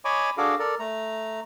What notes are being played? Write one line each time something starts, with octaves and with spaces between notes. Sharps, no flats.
C#5 D#5 G#5 B5 C#6 D6
D4 F#4 G#4 A4 F5 D6
A4 A#4 D5
A3 A#5